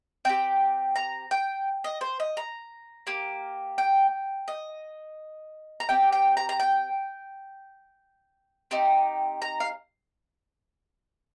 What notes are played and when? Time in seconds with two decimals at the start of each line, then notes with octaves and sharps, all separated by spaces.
0.25 C4 G4 G5
0.96 A#5
1.31 G5
1.84 D#5
2.01 C5
2.20 D#5
2.37 A#5
3.07 A#3 G4
3.78 G5
4.48 D#5
5.80 A#5
5.89 C4 G4 G5
6.12 G5
6.37 A#5
6.49 A#5
6.60 G5
8.71 C4 D#4 G4
9.42 A#5
9.60 F5